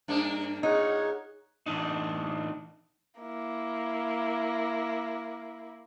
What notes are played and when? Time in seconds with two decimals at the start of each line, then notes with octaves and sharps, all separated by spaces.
0.08 G2 A#3 D4
0.63 A#2 D#4 G#4 C#5 F#5
1.66 A2 E3 D4 D#4
3.21 A#3 E4